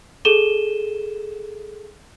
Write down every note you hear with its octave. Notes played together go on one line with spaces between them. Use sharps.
G#4 A4 D#7 E7 G7